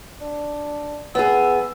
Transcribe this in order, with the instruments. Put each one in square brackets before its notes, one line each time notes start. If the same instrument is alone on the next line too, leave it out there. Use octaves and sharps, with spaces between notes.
[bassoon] D4
[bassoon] E3 [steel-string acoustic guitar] B3 G#4 [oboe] E6